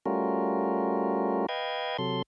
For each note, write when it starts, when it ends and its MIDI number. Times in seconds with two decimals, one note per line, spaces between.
0.06 1.46 55
0.06 1.46 57
0.06 1.46 61
0.06 1.46 65
0.06 1.46 66
0.06 1.46 70
1.49 1.97 71
1.49 1.97 75
1.49 1.97 77
1.49 1.97 79
1.49 1.97 92
1.98 2.22 48
1.98 2.22 54
1.98 2.22 69
1.98 2.22 84